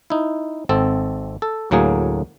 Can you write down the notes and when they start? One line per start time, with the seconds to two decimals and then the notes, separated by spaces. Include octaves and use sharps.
0.10 D#4 E4
0.69 G#1 C4 A4
1.42 A4
1.71 D2 A2 F#3 A#3 G#4